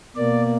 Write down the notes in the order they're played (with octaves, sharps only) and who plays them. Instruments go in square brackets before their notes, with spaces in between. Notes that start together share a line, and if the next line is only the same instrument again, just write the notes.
[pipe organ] B2 A#3 D5